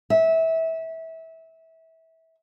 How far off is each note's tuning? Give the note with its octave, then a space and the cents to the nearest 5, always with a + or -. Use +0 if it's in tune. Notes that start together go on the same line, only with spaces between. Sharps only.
E5 -25